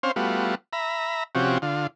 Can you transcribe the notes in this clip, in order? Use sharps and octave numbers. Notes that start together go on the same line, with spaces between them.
C4 C#4 C5 F5
G3 A3 B3 F4 F#4
E5 A#5 B5
C3 F3 C#4 F#4 G4
D3 F4